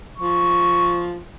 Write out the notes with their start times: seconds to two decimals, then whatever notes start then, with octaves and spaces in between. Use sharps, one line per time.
0.18 F3 C#6